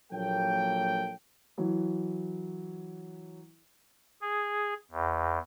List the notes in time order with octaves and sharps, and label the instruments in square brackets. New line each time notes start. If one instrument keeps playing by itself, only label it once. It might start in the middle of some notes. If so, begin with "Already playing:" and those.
[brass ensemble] A#1 F#3 A#3 A4 C#5 G5
[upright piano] E3 F#3
[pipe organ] G#4
E2